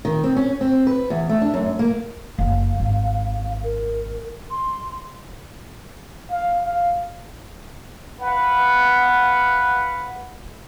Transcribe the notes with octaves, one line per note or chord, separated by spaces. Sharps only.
D#3
C4
C#4
C4
B4
E2
A3
D4
F#2
A#3
F#1 F5
G#1
A#4
C6
F5
F5
B4 F5 F#5